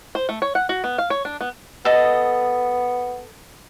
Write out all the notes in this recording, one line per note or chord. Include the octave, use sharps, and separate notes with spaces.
C5
A3
C#5
F#5
F#4
B3
F5
C#5
D4
B3
B3 A4 D#5